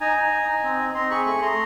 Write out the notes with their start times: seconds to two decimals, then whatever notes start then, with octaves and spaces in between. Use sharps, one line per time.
0.01 D#4 G#5 A#5
0.16 D#4
0.33 D#4
0.49 D#4
0.63 C4
0.79 D#4
0.94 C4 A#5 C6
1.11 G#4 B5 C#6
1.26 A3 B5 C#6
1.41 A3 A#5 C6